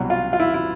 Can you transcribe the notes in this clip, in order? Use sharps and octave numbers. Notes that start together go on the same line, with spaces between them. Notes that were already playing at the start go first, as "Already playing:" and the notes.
Already playing: C2 B2 F#3
F4
F4
E4
E4